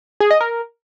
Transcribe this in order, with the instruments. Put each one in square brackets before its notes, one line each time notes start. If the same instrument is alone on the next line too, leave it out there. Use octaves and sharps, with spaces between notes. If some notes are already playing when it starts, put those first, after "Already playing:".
[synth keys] G#4
D#5
A#4